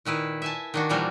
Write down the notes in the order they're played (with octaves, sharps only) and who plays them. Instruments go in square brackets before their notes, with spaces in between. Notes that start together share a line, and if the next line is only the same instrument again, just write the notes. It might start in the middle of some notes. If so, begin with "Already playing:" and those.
[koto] A#2 D#3 E4 B4
E5 G#5 A5
D#3 D4 F#4
A#2 E3 F3 G3 A#3 F#4